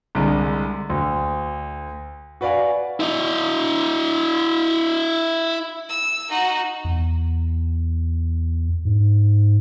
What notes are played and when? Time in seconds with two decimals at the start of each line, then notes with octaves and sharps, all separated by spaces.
0.15 C2 D3 G#3
0.90 D2
2.41 F#4 B4 D5 F5 G#5
3.00 E4 D#5
5.89 E6
6.29 D#4 F#4
6.85 E2
8.85 G#2